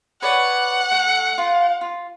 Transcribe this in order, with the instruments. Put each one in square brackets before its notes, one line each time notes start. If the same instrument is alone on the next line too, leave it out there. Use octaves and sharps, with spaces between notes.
[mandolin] B4 C#5 D5 [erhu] F#5
[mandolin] A3
F4
F4